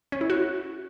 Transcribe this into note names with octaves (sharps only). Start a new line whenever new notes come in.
C#4
E4
F#4